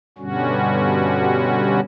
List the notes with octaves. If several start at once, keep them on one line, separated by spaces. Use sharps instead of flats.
G2 B2 D3 G3 C#4 F#4